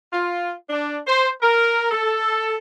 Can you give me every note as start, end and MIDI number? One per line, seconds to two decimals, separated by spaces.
0.13 0.52 65
0.70 0.99 62
1.07 1.29 72
1.42 1.91 70
1.91 2.56 69